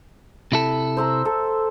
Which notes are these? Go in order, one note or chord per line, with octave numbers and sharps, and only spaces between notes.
C3 E4 A4
C5 E5 A#5
A4